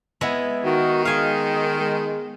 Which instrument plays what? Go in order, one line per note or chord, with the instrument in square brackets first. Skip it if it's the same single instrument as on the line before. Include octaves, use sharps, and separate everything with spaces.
[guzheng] G#3 B3 E4
[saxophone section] D#3 [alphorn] F#4
[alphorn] G#3 [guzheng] F5 G#5
[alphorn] G#3